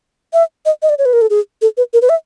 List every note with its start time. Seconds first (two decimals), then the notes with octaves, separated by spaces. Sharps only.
0.33 E5
0.65 D#5
0.82 D#5
0.89 D5
0.98 C#5
1.05 B4
1.13 A#4
1.21 A4
1.30 G#4
1.62 A4
1.77 B4
1.93 A#4
2.02 B4
2.09 E5